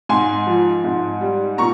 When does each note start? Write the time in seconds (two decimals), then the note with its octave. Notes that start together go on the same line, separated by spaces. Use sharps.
0.09 G#2 G#5 C6
0.47 F3
0.84 G#2
1.21 G3
1.58 A#2 A#5 C#6